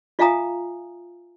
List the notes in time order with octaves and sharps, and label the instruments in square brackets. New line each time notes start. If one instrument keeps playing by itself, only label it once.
[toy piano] F4 E5 F5 G#5 A#5 D#6